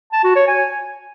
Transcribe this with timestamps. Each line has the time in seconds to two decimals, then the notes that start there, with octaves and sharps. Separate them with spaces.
0.12 A5
0.24 F#4
0.36 C#5
0.48 G#5